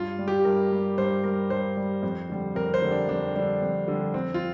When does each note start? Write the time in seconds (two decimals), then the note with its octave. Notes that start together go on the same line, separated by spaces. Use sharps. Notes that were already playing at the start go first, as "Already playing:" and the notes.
Already playing: G2 F4
0.19 G3
0.28 G4
0.45 G2 A#4
0.71 G3
0.98 G2 C5
1.24 G3 A#4
1.50 G2 C5
1.77 G3
2.03 F2
2.30 D3 G3
2.55 F2 A#4
2.74 C5
2.82 D3 G3
2.91 D4
3.08 F2 D4
3.35 D3 G3 D4
3.62 F2
3.88 D3 G3
4.14 F2 C4
4.34 F4